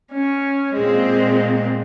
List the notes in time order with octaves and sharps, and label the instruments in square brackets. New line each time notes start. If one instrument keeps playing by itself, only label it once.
[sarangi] C#4
[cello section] A#2 C4 [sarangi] G#3